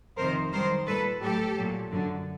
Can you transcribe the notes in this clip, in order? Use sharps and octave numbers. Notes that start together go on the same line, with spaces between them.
F2 C3 D#3 A#4 C5
F#2 D#3 G3 A#4 C5
A#2 G3 A4 B4
A2 F#3 G4 A4
A#2 F#3
F#2 D3 F#3